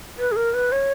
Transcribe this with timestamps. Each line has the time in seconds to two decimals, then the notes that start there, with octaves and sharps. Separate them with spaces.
0.18 B4
0.32 G#4
0.36 A#4
0.54 B4
0.72 C#5